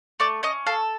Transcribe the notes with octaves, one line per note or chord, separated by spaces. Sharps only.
A3 D5
C#4 D#5
A4 F5